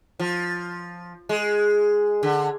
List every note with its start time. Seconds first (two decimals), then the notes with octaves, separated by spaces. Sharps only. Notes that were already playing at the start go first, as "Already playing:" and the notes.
0.19 F3
1.29 G#3
2.23 D3